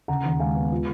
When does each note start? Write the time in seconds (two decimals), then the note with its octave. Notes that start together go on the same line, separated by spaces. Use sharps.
0.08 C#3 F#5 A#5
0.25 D#2
0.40 G#3 F5 G#5
0.56 B3
0.72 F4